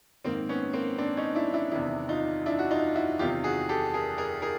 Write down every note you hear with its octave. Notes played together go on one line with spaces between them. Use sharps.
G#2 D#3 A#3 C4
B3 C#4
A#3 C4
C4 D4
C#4 D#4
D4 E4
D4 E4
E2 C3 D#3 D4 E4
D#4 F4
D4 E4
F#4
D#4 F4
E4 F#4
E2 C3 D#3 F4 G4
F#4 G#4
G4 A4
G#4 A#4
G#4 A#4
G#4 A#4